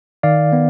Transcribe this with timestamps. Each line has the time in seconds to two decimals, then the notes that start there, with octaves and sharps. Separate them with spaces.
0.23 D#3 D5 F5
0.53 B3